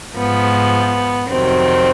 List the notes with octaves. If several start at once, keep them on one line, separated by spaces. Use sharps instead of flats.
G#2 F3 B3
F2 C3 D#3 F#3 C4